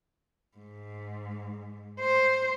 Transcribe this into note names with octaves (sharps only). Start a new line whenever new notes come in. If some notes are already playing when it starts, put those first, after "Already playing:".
G#2
C5